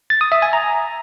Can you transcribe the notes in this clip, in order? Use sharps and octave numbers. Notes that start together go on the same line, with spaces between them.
A6
D#6
E5
G#5
A#5